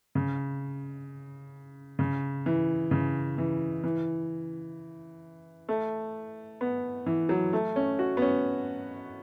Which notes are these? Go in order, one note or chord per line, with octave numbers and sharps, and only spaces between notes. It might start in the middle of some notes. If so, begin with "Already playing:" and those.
C#3
C#3
E3
C#3
E3
E3
A3
B3
E3
F#3
A3
C#4
F#4
B3
C#4